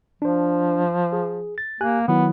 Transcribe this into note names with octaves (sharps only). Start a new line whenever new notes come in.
F3 D4 C5
G#4
A6
A#3 G4 G#5 F#6
D#3 F#3 B3 E4